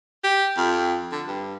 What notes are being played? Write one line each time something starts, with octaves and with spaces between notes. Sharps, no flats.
G4
F2
D3
G2